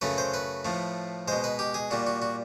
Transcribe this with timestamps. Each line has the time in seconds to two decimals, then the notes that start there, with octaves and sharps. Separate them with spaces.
0.01 F#2 C#3 F#3 A3 B4
0.18 C5
0.34 B4
0.65 A2 F3 A3
1.28 B2 G#3 C5
1.44 B4
1.59 G4
1.74 G#4
1.91 A#2 G3 F#4
2.07 F#4
2.22 F#4